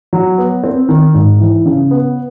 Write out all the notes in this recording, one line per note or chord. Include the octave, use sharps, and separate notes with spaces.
F#3
B3
C4
D#3
G#2
E3
C#3
B3